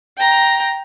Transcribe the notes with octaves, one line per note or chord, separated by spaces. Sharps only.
G5 A#5